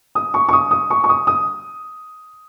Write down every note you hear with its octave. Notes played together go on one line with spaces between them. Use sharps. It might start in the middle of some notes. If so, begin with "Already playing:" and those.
D#6
C#6
C#6
D#6
D#6
C#6
C#6
D#6
D#6